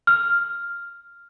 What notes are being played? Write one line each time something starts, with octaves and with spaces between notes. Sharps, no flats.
F6